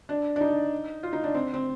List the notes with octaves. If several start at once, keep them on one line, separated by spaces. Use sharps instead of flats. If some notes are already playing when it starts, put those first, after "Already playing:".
D4
D4
D#4
F4
D#4
D4
C4
C4